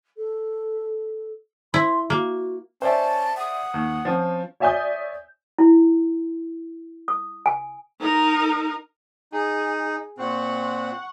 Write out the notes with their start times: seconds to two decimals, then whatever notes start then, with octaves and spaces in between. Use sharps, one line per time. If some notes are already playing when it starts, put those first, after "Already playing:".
0.17 A4
1.74 E4 C6
2.10 A#3 F#4
2.82 C#4 C5 D5 E5 A5
3.37 F#5 D#6
3.74 D#2
4.05 F3 C4 C#4
4.60 C#5 D5 E5 G#5 D#6 G6
5.59 E4
7.08 D#6
7.46 G#5
8.00 D#4 A#4
9.33 D#4 G#4
10.18 A#2 C4 F#5 C#6